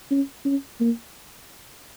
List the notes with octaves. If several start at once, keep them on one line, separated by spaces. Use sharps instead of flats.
C#4
C#4
A#3